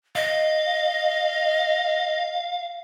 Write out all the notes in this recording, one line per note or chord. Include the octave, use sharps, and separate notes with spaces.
D#5 F5